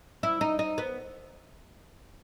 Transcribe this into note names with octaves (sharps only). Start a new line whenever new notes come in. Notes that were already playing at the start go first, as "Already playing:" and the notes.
E4
D#4
D#4
B3